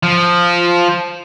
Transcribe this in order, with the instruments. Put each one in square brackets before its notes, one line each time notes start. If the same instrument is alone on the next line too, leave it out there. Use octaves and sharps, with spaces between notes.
[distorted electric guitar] F3